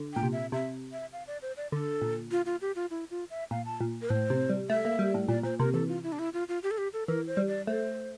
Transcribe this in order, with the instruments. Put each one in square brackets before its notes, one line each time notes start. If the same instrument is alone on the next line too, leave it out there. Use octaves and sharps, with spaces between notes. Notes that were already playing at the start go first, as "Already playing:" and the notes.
Already playing: [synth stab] D3
[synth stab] A#2 [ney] G5
[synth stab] C3
[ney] E5
[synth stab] C3 [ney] E5
[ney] E5
F5
D5
C5
D5
[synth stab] D3 [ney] A4
[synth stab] A#2
[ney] F4
F4
G4
F4
E4
F4
E5
[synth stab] A#2 [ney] F5
[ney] A5
[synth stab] A#2
[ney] A#4
[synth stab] A2 [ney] C5
[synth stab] C3
G3
[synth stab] A3 [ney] E5
[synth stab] A#3
G3
A2
[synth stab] A#2 [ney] D5
[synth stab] A#2 [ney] C5
[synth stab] C3 [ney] A#4
[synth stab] E3 [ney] A4
[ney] F4
E4
D4
E4
F4
F4
G4
A4
G4
A4
[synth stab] E3 [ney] A#4
[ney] C5
[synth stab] G3
[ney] D5
[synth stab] A3 [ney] C5